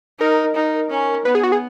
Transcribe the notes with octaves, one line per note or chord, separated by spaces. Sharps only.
D#4 A#4
D#4
C#4
B3 B4
G#4
F#4
G#4